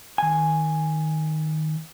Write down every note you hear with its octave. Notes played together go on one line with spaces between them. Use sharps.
D#3 G#5